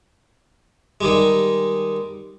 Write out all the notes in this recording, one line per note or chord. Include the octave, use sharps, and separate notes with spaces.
D#3 G3 G#3